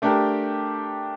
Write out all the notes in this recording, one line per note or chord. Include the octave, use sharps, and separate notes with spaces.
A3 D4 G4 A#4